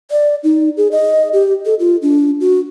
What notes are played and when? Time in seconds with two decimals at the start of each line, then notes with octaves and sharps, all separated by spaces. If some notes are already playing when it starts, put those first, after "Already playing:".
0.11 D5
0.44 D#4
0.77 G#4
0.92 D#5
1.33 G4
1.66 A4
1.79 F4
2.02 D4
2.41 F#4